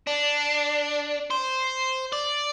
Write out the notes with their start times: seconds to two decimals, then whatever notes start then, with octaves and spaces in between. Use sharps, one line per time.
0.07 D4
1.31 C5
2.13 D5